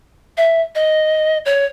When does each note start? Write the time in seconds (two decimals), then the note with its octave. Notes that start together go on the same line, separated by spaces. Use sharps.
0.37 E5
0.75 D#5
1.46 C#5